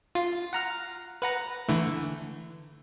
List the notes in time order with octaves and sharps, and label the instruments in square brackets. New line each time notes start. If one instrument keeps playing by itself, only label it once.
[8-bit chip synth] F4
F#5 A#5 F6
B4 F#5 A#5
D3 E3 A3